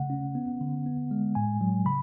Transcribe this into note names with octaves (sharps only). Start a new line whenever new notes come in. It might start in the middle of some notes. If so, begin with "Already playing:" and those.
Already playing: C#3 A3 F#5
C#4
B3
D3
B3
G#3
A2 G#5
F#3
C#3 B5